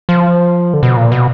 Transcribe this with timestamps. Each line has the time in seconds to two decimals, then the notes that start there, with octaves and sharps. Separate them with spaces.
0.09 F3
0.73 D3
0.83 B2
0.97 A#2
1.12 B2